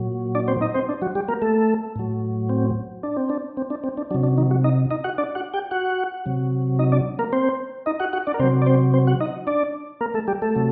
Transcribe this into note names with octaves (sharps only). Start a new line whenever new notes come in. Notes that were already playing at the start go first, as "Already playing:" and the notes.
Already playing: A#2 F#3
D4 D5
C4 C5
D#4 D#5
C4 C5
D4
F#3 F#4
G3 G4
A#3 A#4
A3 A4
A2 F#3
C4
D4
C4
D4
C4
D4
C4
D4
C3 F#3 D4
D4
D#3 D#4
F#3 F#4
D#4 D#5
D#4 D#5
F#4 F#5
D4 D5
F#4 F#5
G4 G5
F#4 F#5
C3 F#3
D#4 D#5
D4 D5
A#3 A#4
C4 C5
D#4 D#5
F#4 F#5
F#4 F#5
D4 D5
A#4
C3 F#3 C4 C5
D5
C4 C5
C4 C5
F#4 F#5
D#4 D#5
D4 D5
A#3 A#4
A3 A4
G3 G4
A3 A4
C3 F#3